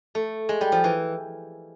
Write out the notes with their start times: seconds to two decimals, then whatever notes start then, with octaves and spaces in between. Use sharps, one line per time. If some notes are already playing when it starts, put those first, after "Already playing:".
0.15 A3
0.49 G#3
0.61 G3
0.72 F3
0.84 E3